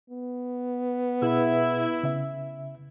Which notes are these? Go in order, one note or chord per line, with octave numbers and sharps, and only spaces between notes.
B3
B2 E4 G#4 E6
C#3 E5